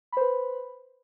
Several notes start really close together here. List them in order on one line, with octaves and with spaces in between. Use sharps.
B5 C5 B4